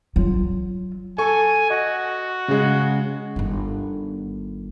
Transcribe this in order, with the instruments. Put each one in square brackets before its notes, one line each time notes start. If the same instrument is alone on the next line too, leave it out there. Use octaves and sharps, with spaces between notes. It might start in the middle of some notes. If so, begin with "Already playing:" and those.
[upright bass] F#3 F4
[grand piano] A4 C#6 [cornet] G#5
[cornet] F#4 [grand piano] D#5
[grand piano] C#3 G#3
[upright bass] G1 D#3